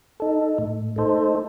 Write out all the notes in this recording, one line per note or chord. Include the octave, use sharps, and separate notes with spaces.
D#4 A4
A2
A3 D#4 A4 C5